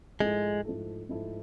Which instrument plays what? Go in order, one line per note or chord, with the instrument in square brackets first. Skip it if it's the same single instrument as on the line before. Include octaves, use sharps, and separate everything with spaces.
[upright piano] G#2 F3 A3 E4 A4 [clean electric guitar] G#3
[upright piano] G#2 F3 A3 E4 A4
G#2 F3 A3 E4 A4